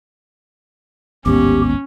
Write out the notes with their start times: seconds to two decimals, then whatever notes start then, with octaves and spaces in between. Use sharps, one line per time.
1.26 A1 D#2 G#2 B3 C#4 G4